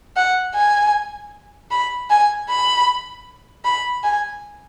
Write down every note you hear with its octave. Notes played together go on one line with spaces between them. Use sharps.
F#5
G#5
B5
G#5
B5
B5
G#5